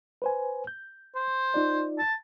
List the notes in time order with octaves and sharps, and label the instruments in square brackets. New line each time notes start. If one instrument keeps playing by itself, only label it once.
[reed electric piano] B4 C5 G#5
G6
[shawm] C5
[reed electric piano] D#4 F4 D5
[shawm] A5